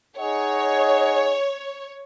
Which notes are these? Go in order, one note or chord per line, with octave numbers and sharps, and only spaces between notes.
D#4 G#4 C#5 D#5 F#5